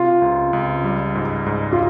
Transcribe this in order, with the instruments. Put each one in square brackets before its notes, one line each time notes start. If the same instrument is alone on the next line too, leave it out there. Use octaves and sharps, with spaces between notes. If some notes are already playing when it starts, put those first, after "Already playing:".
Already playing: [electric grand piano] C3 [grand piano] F4
[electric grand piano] C#2
C#2
G3
G#2
G#2
[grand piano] F4